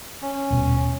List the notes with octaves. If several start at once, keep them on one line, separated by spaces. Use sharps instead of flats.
C#4
D#1 B2